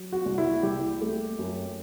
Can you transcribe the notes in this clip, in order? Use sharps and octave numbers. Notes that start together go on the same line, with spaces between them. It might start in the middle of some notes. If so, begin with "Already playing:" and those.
Already playing: F#3
F#4
C2
E4
C2 G4
A3
F#2